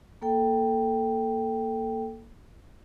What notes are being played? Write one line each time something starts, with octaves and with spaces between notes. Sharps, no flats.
A#3 A4 G5